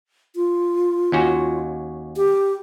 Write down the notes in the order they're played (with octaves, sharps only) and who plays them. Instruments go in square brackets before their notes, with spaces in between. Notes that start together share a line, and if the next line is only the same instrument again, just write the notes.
[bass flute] F4
[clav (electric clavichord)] D#2 C#4 F#4
[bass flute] G4